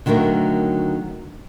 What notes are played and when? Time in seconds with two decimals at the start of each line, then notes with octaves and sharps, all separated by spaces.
0.06 D3 D#3 F#3 A3 A#4